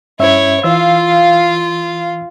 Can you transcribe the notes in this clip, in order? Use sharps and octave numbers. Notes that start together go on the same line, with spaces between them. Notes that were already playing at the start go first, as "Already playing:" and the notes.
G2 C#4 E4 C#5 E5
E3 F4 F5 E6